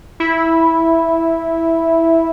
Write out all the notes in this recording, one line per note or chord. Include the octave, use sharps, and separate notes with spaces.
E4